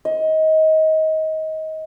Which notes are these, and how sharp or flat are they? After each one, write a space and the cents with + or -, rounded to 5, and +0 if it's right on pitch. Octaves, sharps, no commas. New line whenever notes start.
D#5 +25